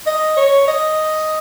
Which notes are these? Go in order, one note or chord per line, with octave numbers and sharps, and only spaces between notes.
D#5
C#5
D#5